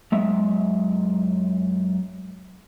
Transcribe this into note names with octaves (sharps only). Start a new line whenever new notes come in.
F#2 G#3 E5